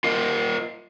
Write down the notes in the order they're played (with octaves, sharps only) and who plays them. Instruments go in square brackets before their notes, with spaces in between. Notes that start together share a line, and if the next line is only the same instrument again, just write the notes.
[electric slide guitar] F4 A#4 D#5